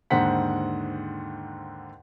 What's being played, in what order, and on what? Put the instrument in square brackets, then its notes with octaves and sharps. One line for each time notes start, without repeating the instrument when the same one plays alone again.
[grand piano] D#2 G#2 D3 C5 F#5 B6